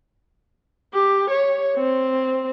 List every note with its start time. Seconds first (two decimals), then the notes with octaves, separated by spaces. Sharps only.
0.94 G4
1.30 C#5
1.76 C4